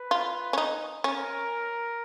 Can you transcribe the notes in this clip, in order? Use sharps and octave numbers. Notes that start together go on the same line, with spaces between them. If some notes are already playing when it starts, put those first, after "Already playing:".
Already playing: B4
F4
C#4
D#4
C#4 A#4